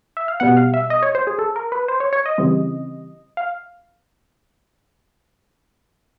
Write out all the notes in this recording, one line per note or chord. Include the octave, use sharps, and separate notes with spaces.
E5
F5
B2 G3 B3 F#5
F5
E5
D#5
C#5
C5
G#4
A4
A#4
B4
C5
C#5
C#5
D#5
C#3 E3 G3 C4
F5